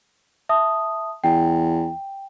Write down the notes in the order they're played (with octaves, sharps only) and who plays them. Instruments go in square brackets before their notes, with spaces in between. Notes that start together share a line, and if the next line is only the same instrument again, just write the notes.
[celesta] E5 A5 D#6
[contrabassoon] E2 [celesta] G5